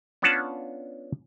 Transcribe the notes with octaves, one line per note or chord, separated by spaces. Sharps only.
B3 C#4 D4 F4 F#5 A5